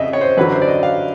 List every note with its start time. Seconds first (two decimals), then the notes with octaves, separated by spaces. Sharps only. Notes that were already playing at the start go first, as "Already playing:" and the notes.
Already playing: F2 C#3 D#5 E5
0.13 C#5
0.21 C5
0.37 F#2 D3 F#3 B4
0.52 C5
0.62 D5
0.68 D#5
0.83 F5